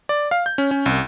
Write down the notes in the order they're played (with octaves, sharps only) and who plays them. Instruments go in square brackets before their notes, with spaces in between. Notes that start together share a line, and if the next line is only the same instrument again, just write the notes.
[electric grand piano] D5
F5
G6
C#4
C#4
C2